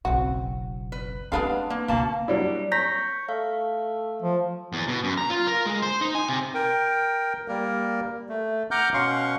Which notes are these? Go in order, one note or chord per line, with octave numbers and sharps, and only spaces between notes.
F#1 B1 C4 F#4
B4
G3 G#3 B3 C4 D4 D#4 B4 F5
A#3
C#2 B2 A#3 A5
F#3 G3 D4 E4
C#5 A#5 G6 A#6 B6
A3 F5
F3
E2
B2
F#2
A#5
F4
A#4
G#3
C5
D#4
G#5
C3
A#4 G5
G3 A#3 A#4
A3
F#5 A#5 D6 F6 G6
B2 C#4 F5 F#5 C6 C#6